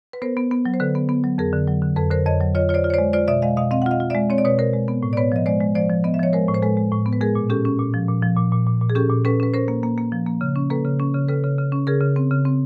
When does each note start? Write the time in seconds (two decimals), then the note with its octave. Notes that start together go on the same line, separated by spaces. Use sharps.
0.13 B4
0.22 B3 A#4 C5
0.37 B3
0.51 B3
0.66 F#3
0.74 C5
0.80 D3 A4 B4
0.95 B3
1.09 B3
1.24 F#3
1.38 F2 G#4 A#4
1.53 D3
1.68 F#3
1.82 D3
1.96 F2 A4 B4
2.11 D3 A#4 C5
2.26 F2 C#5 D#5
2.41 F#3
2.55 F4 C#5 D#5
2.69 F4 C#5
2.74 C5 D5
2.84 F4
2.90 C#5
2.94 G#3 C5 D5
3.13 F4 C5 D5
3.28 B2 D5 E5
3.42 G#3 D#5 F5
3.57 B2 D#5 F5
3.71 C4 D#5 F5
3.82 F#5
3.86 F4 D#5 F5
4.00 F4
4.10 G#3 D5 E5
4.30 C4 C#5
4.38 D5
4.44 B2 B4 C#5
4.59 B2 A#4 C5
4.73 G#3
4.88 B3
5.03 A2
5.13 D5
5.17 B3 B4 C#5
5.32 F3 D#5
5.46 G#3 C5 D5
5.60 G#3
5.75 F3 C5 D5
5.90 F3
6.04 B3 D#5
6.14 E5
6.19 F3 C#5 D#5
6.33 G#3 A#4 C5
6.48 A2
6.54 C5
6.62 G#3 A4 B4
6.77 G#3
6.92 A2
7.06 B3
7.13 B4
7.21 G#3 G#4 A#4
7.35 A#2
7.50 C#4 G4 A4
7.65 C#4
7.79 A#2
7.94 F3
8.08 A#2
8.23 F3
8.37 A#2
8.52 A#2
8.67 A#2
8.81 A#2
8.90 G#4
8.95 C#4 G4 A4
9.10 A#2
9.25 C#4 A4 B4
9.40 C#4 B4
9.54 C#4 A#4 C5
9.68 A#3
9.83 A#3
9.98 A#3
10.12 F3
10.26 A#3
10.41 C#3
10.56 C#4
10.70 A#3 A4 B4
10.85 C#3
11.00 C#4
11.14 C#3
11.28 C#3 A4 B4
11.43 C#3
11.58 C#3
11.72 C#4
11.87 C#3 G#4 A#4
12.01 C#3
12.16 C4
12.31 C#3
12.45 C4